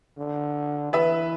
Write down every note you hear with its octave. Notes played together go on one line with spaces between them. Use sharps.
D3
E3 B4 E5